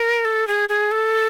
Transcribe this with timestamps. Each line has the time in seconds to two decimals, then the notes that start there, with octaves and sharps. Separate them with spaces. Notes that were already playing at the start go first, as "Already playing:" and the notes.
Already playing: A#4
0.25 A4
0.47 G#4
0.69 G#4
0.91 A4